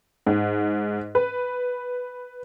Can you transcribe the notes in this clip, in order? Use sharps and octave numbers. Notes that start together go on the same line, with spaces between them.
G#2
B4